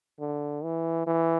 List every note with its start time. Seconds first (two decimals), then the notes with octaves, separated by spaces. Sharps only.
0.20 D3
0.64 E3
1.07 E3